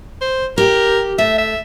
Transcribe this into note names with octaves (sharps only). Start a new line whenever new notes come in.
C5
G4 A#4
A3 E5
E5